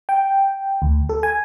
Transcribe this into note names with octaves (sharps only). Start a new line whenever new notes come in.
G5
D2
A4
G#5